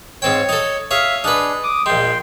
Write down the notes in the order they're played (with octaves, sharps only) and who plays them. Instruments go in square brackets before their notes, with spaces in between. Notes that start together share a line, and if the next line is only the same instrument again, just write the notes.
[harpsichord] G#2 C4 G5 [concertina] C#5
[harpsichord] D#4 A4
[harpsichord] G#4 C#5 [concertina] E5 F5
[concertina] D4 G#4 [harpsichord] D#4 B4
[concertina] D6 D#6
[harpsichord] A#1 G#3 [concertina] G5 C6